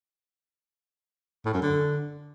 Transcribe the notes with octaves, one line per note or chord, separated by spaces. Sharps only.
A2
F#2
D3